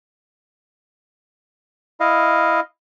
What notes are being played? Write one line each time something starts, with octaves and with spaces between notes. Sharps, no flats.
E4 D#5 F5